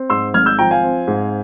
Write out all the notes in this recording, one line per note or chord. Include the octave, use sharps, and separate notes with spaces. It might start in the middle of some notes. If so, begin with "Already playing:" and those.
Already playing: C4
G#2 C6 E6
G#1 F6 G#6
E6 G6
F3 G5 A#5
F5 G#5
C4
G#2